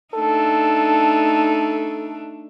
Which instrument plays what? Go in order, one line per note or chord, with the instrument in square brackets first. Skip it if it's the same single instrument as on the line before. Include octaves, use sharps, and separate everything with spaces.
[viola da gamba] A3 D4 D#4 [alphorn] A4